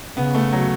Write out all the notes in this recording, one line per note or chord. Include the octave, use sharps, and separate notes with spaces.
C#3 B3
A3
F#3